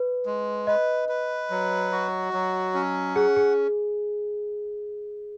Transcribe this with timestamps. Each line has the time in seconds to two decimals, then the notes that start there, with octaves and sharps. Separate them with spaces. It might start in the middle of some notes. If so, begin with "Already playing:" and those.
Already playing: B4
0.26 G#3
0.67 B4 D#5
1.09 B4
1.50 F#3
1.92 F#4
2.33 F#3
2.74 C#4
3.16 G#4 F#5
3.36 G#4